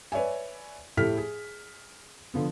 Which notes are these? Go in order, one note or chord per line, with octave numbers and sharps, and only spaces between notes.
B4 C#5 D5 E5 G#5
A2 A3 E4 G4 F6 B6
G#4
D3 F3 B3